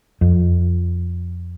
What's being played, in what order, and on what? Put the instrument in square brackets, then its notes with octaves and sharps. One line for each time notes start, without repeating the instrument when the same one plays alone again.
[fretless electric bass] F2